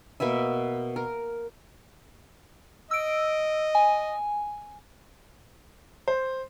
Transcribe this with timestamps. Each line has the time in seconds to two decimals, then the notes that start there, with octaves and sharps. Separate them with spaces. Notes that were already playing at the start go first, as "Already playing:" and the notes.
0.20 B2 A#3 B4 E5
0.96 A#4
2.91 D#5 E6 D7
3.75 G#5
6.08 C5